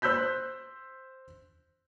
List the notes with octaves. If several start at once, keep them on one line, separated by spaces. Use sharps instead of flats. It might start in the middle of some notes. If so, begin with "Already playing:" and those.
C5 E6 F#6 G6 B6